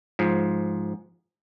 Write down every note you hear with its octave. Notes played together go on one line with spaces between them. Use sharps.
G#2 F3